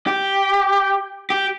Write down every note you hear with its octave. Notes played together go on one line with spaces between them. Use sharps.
G4
G4